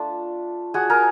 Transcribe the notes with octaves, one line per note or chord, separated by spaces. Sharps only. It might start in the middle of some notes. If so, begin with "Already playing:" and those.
Already playing: A3 D4 F4
F#4 G#4
G#4 A#4